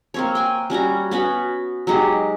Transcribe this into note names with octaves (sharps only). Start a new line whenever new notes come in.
A#3 C4 C#5
G5 G#5
G3 C#4 F#4 A#5
B3 C#4 F#4 B5
F#3 G#3 D#4 G4